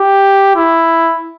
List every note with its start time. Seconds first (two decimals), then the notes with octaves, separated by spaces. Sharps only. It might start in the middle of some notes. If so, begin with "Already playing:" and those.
Already playing: G4
0.56 E4